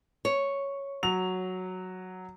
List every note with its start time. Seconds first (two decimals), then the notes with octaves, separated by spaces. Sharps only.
0.25 C#5
1.03 F#3 F7